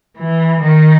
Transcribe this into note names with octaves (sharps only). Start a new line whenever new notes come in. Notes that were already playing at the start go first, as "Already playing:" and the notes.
E3
D#3